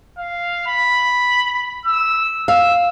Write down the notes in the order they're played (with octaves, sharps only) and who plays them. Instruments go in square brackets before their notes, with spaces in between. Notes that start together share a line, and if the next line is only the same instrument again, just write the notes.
[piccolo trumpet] F5
B5
E6
[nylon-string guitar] F5 [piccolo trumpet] E6